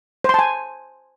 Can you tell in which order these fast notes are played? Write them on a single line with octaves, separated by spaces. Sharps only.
C5 C6 A5 G#5